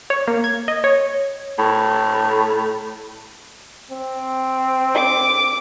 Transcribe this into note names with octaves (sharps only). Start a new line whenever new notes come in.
C#5
A#3
G#6
D#5
C#5
A2
C4
D6